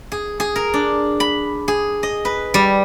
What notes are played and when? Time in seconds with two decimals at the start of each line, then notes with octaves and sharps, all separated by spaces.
0.12 G#4
0.40 G#4
0.56 A#4
0.74 D4
1.20 B5
1.68 G#4
2.03 D#5
2.25 B4
2.54 G3